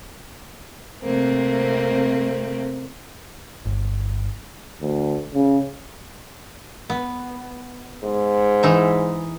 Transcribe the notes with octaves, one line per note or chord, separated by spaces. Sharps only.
C3 A3 A#3 C4
G1
D2
C#3
B3
G#2
E3 D#4 E5